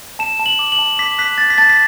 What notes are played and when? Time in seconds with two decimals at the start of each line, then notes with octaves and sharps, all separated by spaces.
0.19 A5 E7
0.39 A5
0.46 F#7
0.59 D6
0.72 F#7
0.79 A5
0.99 D6 B6
1.19 F#6 B6
1.38 F#6 A6
1.50 B6
1.58 A5 A6
1.70 B6